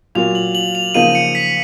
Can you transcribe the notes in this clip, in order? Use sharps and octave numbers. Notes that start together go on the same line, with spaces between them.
A#2 F#3 A#3 F7
F#7
F#7
F7
C#3 F3 A#3 D#4 D#7
C#7
B6